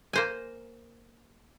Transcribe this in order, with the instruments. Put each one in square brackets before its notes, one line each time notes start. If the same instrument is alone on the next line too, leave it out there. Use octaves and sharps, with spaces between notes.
[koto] A#3 C5 G#5